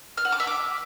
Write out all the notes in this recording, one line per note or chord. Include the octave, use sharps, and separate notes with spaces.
F6
F#5
D6
E5
D6